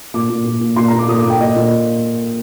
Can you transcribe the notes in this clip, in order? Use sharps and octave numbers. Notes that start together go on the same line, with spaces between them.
A#2 D6
A#2
A#2
A#2
A#2 C6
A#5
A#2
D6
A#2 D#6
D6
A#2 G5
A#2 D#5
A#2